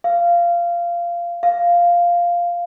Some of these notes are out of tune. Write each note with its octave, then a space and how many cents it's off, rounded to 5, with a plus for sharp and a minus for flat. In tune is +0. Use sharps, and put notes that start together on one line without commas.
F5 -15
F5 -5